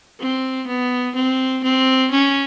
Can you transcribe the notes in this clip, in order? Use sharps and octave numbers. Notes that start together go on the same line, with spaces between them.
C4
B3
C4
C4
C#4